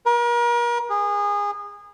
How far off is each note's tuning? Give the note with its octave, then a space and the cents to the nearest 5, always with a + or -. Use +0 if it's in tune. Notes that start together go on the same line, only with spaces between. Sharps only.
A#4 +40
G#4 -25